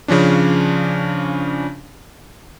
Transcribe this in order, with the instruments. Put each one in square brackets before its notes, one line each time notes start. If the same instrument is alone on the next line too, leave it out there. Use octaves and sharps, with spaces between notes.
[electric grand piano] C#3 F3 C#4 D4